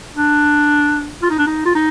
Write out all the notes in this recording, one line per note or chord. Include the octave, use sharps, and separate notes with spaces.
D4
F4
D#4
D4
D#4
F4
D#4